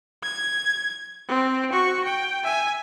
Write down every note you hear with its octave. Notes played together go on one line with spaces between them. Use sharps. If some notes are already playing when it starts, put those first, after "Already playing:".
G#6
C4
F#4 C#6
G5
E5 G#5